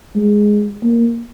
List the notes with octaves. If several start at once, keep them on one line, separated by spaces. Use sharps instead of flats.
G#3
A#3